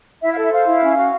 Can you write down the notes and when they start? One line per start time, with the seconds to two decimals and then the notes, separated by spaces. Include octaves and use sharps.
0.22 E4 E5
0.32 F5
0.38 A4 E5
0.52 C5 F5
0.67 E4
0.83 C#4
0.97 F#4